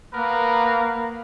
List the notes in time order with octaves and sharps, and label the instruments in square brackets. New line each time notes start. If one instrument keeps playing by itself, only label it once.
[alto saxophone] A#3 [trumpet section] B3 A#4 B4